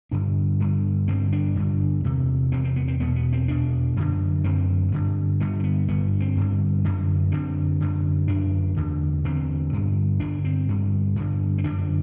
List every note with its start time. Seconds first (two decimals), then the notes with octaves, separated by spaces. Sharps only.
0.11 G2 D3 D4
0.60 G2 D3
1.08 G2 D3 C4
1.32 D4
1.56 G2 D3
2.04 E2 C3
2.52 E2 C3 C4
2.64 C4
2.76 B3
2.88 C4
3.00 E2 B2 B3
3.16 B3
3.33 C4
3.48 E2 B2 D4
3.96 F#2 D3
4.44 F#2 D3 C4
4.92 G2 D3
5.40 G2 D3 B3
5.60 C4
5.64 B3
5.88 G2 D3 B3
6.20 C4
6.37 G2 D3
6.84 F#2 D3
7.32 F#2 D3 C4
7.81 F#2 D3
8.28 F#2 D3 D4
8.76 E2 D3
9.24 E2 D3 C4
9.73 G2 D3
10.20 G2 D3 D4
10.44 C4
10.69 G2 D3
11.16 G2 D3
11.58 C4
11.64 F#2 D3 D4